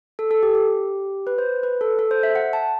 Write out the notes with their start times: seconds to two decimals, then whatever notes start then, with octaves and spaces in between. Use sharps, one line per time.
0.19 A4
0.31 A4
0.43 G4
0.54 G4
1.27 B4
1.38 C5
1.63 B4
1.81 A4
1.99 A4
2.11 C5
2.23 E5
2.35 F#5
2.53 A5